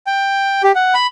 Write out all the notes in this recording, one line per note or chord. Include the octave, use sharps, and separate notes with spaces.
G5
G4
F#5
B5